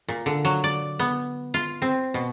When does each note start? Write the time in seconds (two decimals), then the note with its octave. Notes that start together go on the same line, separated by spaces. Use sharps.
0.08 A#2
0.26 D3
0.45 F#3
0.64 D5
0.99 B3
1.54 F4
1.82 C4
2.14 B2